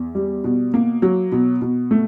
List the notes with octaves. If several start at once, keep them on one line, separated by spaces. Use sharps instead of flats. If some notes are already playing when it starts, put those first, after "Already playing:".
Already playing: E2
G3
B2
A#3
F#3
B2
B2
A3